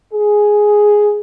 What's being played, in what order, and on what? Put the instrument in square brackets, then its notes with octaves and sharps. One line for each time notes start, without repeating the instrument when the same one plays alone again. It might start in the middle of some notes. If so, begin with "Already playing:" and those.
[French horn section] G#4